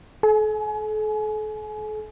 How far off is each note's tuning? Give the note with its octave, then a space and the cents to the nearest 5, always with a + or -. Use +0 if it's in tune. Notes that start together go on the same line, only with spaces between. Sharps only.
A4 -40 G#5 +30